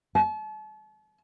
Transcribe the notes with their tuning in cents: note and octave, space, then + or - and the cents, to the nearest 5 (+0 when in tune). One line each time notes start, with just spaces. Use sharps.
A5 -40